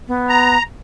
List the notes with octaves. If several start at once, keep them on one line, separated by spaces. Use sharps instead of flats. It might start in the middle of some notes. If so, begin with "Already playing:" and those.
B3
A#5